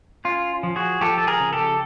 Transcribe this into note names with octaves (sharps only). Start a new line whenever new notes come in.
C#4 F4
F3
F#4 G#4
F3 G4 A4
A4
G#4 A#4
C#3
G4 A4